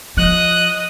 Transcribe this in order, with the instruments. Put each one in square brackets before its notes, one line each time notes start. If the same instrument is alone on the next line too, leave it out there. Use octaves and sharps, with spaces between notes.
[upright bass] F3 [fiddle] D#5 D#6 [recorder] F#6